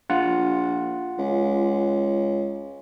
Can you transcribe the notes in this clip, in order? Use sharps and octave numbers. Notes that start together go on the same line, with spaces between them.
A#1 F4 F#5
C#2